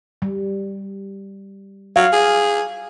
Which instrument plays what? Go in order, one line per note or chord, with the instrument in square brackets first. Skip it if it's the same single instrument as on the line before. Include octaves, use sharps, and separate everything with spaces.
[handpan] G3
[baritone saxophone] F#3 [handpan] F5
[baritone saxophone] G#4